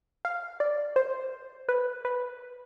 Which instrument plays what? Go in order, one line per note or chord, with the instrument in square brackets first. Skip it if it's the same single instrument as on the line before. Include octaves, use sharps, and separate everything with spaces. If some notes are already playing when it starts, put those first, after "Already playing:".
[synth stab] F5
D5
C5
B4
B4